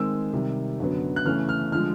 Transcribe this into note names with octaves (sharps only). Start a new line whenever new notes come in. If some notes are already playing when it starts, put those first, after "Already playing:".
Already playing: D#3 G#3 C4 E6
C3 D#3 G3
F#2 D3 F#3 B3
F#6
C#3 E3 A3 C#4 F6
F6
D3 F3 G#3 F6